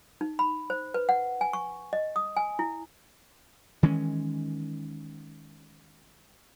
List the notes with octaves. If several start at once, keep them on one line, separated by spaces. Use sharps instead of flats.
D#4
B5
C5
B4
F#5
G#5
C#6
D#5
D#6
G#5
E4
D#3 E3 G#3 C#4